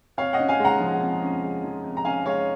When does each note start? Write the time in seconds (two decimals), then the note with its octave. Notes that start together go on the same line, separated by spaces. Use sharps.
0.17 F2 C#5 F5
0.33 D#5 F#5
0.39 C#4
0.49 F5 G#5
0.60 G#3
0.65 F#5 A#5
0.80 F3
1.01 F2
1.23 C#4
1.43 G#3
1.64 F3
1.84 F2
1.97 A#5
2.05 C#4 F5 G#5
2.26 G#3 C#5 F5